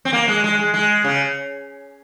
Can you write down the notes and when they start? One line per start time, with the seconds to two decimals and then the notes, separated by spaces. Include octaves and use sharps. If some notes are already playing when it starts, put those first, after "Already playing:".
0.05 C4
0.13 A#3
0.28 G#3
0.44 G#3
0.59 G#3
0.74 G#3
1.04 C#3